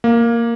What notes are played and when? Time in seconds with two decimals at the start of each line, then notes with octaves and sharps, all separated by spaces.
0.04 A#3